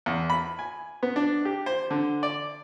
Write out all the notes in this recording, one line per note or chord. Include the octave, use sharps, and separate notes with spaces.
E2
B5
G#5
B3
D4
G4
C5
D3
D5